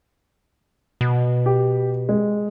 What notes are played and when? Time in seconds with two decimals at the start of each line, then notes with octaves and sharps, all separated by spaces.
1.01 B2
1.46 G4
2.09 G#3